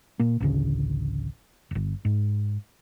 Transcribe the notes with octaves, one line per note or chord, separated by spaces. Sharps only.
A#2 A#3
A1 D2 C#3
D1 G1
G#2